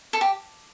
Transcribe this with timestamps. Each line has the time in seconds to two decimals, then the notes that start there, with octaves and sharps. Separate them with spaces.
0.13 A4
0.21 G4